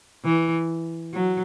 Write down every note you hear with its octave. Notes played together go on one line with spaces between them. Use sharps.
E3
F#3